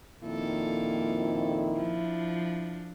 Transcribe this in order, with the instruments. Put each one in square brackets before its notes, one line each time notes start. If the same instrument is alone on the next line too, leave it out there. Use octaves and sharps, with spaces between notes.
[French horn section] F2 A#2 D#3 [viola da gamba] A#3 A4 [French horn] E4
[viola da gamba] F3 D4